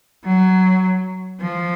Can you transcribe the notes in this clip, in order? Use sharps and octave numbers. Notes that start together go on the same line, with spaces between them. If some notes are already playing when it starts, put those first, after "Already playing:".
F#3
F3